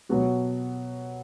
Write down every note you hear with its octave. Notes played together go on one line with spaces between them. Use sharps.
B2 F#3 B3 F#4